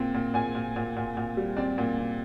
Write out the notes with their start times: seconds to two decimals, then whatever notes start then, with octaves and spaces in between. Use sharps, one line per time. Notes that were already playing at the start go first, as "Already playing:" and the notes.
Already playing: A#2 C4
0.14 A#2
0.34 A#2 G#5
0.55 A#2
0.76 A#2
0.96 A#2
1.17 A#2
1.37 G3
1.57 C4 D5
1.78 A#2
1.98 C4